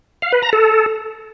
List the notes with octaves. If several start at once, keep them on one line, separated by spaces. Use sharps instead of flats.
F5
B4
A#5
A4